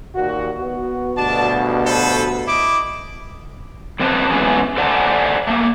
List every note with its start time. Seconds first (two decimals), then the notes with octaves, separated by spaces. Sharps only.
0.15 D#2 A#2 F#4
0.58 B3 F#4
1.17 D2 G2 B2 D4 A5
1.86 A4 B4 C5
2.47 E4 D#5 D6
3.99 F#2 D3 C4 B4 C5 A5
4.30 E3 F#3 G#3 A3 B3 C#4
4.77 A4 C5 D5 F#5 G#5 A5
5.47 A3 A#3